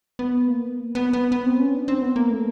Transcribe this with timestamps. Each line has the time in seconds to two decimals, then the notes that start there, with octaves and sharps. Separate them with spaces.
0.19 B3
0.48 A#3
0.95 B3
1.13 B3
1.32 B3
1.46 C4
1.60 C#4
1.75 D4
1.88 C4
2.02 B3
2.16 A#3
2.30 A3